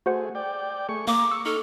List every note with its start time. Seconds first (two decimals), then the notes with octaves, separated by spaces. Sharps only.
0.06 A3 F#4 G#4 C5 F#5
0.35 D5 G5
0.89 A3 G#4 C#6
1.08 A#3 A#5 D6
1.31 C#6 E6
1.45 D#4 A4 C#6 F6